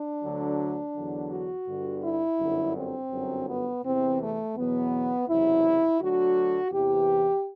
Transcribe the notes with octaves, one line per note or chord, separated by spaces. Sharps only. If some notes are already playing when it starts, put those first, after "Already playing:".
Already playing: D4
D2 D3 F#3
E2 D3 F#3
F#4
G1 G2 D3
E4
G1 F#2 D3 F#3
C4
G1 F#2 F#3
B3
E2 C3 E3 C4
A3
E2 B2 F#3 B3
F#1 E2 C3 F#3 E4
D2 D3 F#3 F#4
E2 C3 E3 G4